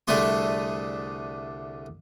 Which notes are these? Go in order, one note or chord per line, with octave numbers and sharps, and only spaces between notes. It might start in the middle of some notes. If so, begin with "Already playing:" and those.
C2 D3 A3 G#4 C6